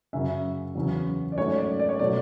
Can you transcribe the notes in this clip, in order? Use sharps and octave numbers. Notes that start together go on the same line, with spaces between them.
F#2 C#3 F#3 C#4 E5
E2 C#3 F#3 C#4
D5
G#2 F#3 A3 C#4 C#5
D5
D5
C#5
B2 F#3 A3 D5